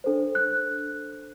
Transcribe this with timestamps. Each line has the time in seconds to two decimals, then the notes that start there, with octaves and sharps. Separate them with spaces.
0.04 D4 A4 C5
0.35 F#6